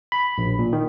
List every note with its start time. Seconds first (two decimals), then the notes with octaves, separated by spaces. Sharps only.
0.12 B5
0.38 A#1
0.59 A#2
0.73 D#3